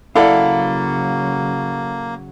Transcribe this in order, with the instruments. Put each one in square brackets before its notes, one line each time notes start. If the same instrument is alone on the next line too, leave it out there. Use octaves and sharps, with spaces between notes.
[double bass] C#3 F#3 [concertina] A#3 [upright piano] E4 A4 D5 [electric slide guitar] F5 F#5